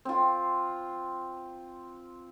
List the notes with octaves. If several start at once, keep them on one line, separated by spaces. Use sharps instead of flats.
C4 F4